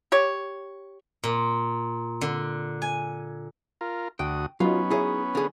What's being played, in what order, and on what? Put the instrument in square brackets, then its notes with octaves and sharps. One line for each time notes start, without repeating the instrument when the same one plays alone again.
[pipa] G4 C#5
[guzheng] A#2
D3
G#5
[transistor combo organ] F4 A#4
[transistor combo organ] D2 F#4 D#6 [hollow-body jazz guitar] G5
[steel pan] F#3 D#4 [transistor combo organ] B3 C#4 [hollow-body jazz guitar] F4
[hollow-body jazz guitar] D#4 G#4 [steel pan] E4 B4 C#5
[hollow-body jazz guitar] D3 G#4